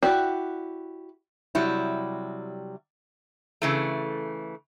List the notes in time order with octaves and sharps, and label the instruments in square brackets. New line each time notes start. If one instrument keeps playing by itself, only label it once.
[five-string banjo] E4 F#4 G4 D5
[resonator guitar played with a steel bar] C3 F#3 G3 E4
C#3 E3 A3